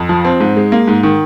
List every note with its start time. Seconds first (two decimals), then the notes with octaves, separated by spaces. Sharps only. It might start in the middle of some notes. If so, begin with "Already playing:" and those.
Already playing: F2
0.09 F3
0.25 C4
0.40 G#2
0.57 G#3
0.72 A#3
0.88 G#2
1.03 D#3